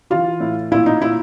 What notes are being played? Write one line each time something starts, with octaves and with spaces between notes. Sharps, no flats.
E3 F4
A2
A#2 E4
D#4
A#2 E4